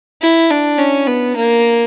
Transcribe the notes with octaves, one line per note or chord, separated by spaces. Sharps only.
E4
D4
C#4
B3
A#3